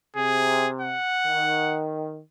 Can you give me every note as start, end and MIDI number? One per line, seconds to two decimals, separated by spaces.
0.16 0.93 48
0.16 0.69 68
0.81 1.81 78
1.27 2.19 51